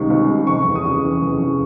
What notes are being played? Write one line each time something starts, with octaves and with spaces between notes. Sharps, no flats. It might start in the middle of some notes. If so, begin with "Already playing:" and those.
Already playing: C#2 C3 D#3 G3 C#6
C#2
C3
F1 C#6
E2
D#6
C#3
E3
F1
E2